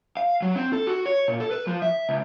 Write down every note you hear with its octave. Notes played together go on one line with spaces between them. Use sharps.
F5
F#3
C4
A4
F#4
C#5
A#2
A4
B4
F3
E5
C#2